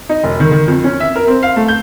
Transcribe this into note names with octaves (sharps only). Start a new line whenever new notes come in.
D#4
E1
D#3
D#3
F2
C#4
E5
A#4
C4
F5
A3
G6